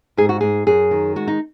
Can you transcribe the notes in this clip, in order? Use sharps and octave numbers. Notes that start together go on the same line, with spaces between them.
G#2 G#4
F#4
G#2 G#4
F#2 G#4
D#3
G#3 F#4
D#4